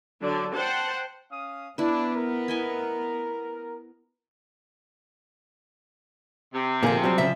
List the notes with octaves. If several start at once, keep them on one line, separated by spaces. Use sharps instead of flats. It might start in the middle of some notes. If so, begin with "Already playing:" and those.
D3 F#3 D4 D5
C5 F#5 G5 A5
C#4 F5 D#6
B3 D4 E4 B4
A#4
E4 D#5 G#5
C3
A#2 D3 F3 A#3 G#4
F#3 G3 C4
C#3 F3 E5